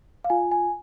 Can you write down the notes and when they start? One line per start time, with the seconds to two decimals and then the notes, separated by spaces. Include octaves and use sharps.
0.24 F5
0.30 F4 G#5
0.51 G#5